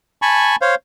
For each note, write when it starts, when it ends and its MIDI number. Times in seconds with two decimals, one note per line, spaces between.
0.22 0.56 80
0.22 0.56 81
0.22 0.56 83
0.22 0.56 85
0.62 0.75 72
0.62 0.75 73
0.62 0.75 77